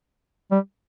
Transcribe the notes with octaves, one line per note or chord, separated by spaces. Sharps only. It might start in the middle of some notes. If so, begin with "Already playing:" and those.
G3